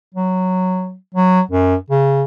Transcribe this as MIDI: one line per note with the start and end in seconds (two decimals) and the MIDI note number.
0.15 0.95 54
1.15 1.41 54
1.51 1.75 42
1.90 2.24 49